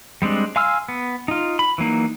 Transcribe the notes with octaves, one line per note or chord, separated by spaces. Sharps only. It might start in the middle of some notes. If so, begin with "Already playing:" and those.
G3 G#3 C4 D4
F5 G#5 C6 E6 F6
B3
D#4 F4
B5
E3 F#3 A#3 D#4